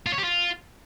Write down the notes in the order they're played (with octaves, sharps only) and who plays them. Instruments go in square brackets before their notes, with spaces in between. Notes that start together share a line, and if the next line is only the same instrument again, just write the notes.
[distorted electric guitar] F4
C#5
G4
F4